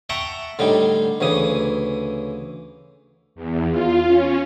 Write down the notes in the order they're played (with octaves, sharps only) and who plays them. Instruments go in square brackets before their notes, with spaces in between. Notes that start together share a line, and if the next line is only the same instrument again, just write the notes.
[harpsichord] E5 F#5 G5 A5 A#5 C#6
A2 D3 G3 D#4
D2 C#3 E3 D#6
[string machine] E2
F4
C#4